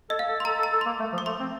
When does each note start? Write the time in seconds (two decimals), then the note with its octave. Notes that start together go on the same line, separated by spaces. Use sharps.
0.10 A4 D#5
0.19 F5
0.28 A4
0.40 C6
0.45 A4 A#5
0.59 A4
0.63 A#5
0.72 A4
0.81 A#3 C6
0.99 A3
1.13 F3
1.18 D6
1.26 A3 C6
1.40 C4